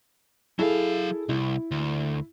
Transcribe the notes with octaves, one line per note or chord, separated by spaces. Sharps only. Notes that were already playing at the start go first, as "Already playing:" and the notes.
F#3 E4 G#4 A4 F5
C2 E4
D2